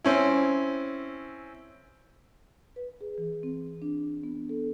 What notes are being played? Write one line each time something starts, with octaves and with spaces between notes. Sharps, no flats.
C4 C#4 E4
B4
G#4
E3
C4
D4
B3
A4